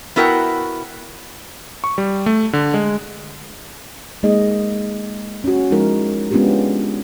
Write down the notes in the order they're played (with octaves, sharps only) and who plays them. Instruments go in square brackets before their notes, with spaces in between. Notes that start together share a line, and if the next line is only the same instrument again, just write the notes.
[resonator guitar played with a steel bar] B3 E4 F#4 A#4 F#5 G5
[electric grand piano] C#6
G3
A3
D3
G#3
[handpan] G#3 A#3 D#4 G#4 D#5
C#4 F#4
F3 G#3 D#4 E4 A#4
G#3 B3 C#4 D4 F4 G4